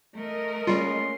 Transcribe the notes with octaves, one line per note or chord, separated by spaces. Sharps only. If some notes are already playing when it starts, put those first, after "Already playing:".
A3 A#4 D#5
G3 G#3 A#3 C#4 F4 C6